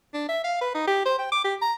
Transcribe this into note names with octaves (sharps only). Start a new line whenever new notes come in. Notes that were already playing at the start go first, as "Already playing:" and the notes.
D4
E5
F5
B4
D#4
G4
C5
G5
D6
G4
A#5